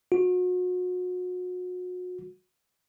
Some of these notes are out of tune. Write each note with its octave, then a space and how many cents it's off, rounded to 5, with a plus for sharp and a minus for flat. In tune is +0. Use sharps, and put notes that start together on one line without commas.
F#4 -35